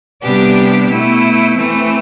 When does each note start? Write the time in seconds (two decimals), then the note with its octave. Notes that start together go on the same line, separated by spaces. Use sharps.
0.21 C3 G3 B3 D4 G4
0.89 B2 A3 E4
1.55 E3 A3 C4